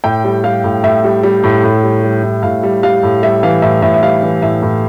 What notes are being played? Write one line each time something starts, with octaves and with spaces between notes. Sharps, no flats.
A2 G5
G3
G3 F5
A2
A2 E5
G3
G3
A2
A2
G3
G3
A2
A2 F5
G3
G3 F5
A2
G3 E5
E3 F5
A2 E5
A2 E5
E5
G3 F5
E3
A2 E5
A2